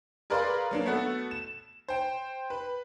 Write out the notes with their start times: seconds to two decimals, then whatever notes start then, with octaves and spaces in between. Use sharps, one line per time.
0.30 G#4 A#4 B4 D5 F5 C6
0.71 F#3 A#3 D4
0.86 A3 B3 F#4 A4
1.31 E7
1.88 C5 G5
2.50 B4